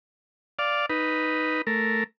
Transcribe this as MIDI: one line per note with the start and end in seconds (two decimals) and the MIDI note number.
0.59 0.86 74
0.59 0.86 77
0.90 1.62 63
0.90 1.62 71
1.67 2.04 57
1.67 2.04 70